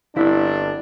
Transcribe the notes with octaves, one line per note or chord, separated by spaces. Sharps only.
G1 C4 D4 E4 B6